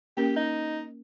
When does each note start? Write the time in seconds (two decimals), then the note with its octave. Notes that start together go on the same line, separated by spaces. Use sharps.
0.17 A#3 C#4 G4 A#4
0.36 D#4